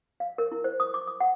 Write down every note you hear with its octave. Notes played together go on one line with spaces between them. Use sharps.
F5
A#4
E4
C5
D#6
D6
D#6
F#5